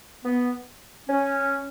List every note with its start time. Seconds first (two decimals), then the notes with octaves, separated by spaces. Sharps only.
0.25 B3
1.09 C#4